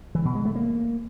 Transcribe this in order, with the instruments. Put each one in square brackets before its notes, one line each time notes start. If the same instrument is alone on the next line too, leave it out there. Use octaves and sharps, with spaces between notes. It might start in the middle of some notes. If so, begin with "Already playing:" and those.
[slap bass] E3
B2
G#3
A3
A#3